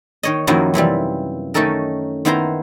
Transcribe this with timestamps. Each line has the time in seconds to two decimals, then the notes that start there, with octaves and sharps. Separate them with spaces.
0.23 D#3 C#5 D#5
0.47 F#2 D#3 F3 F#3 A#3 E4
0.74 F#2 C3 E3 G3
1.54 D#3 A3 C#4 D#4 A4 A#4
2.25 D#3 B3 E4 C5 A#5 C6